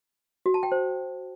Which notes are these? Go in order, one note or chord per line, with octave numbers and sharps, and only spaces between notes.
F#4
A5
G5
C5